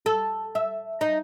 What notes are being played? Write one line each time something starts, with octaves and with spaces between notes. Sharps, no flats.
A4
E5
D#4